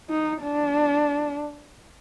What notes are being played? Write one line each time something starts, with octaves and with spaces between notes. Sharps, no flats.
D#4
D4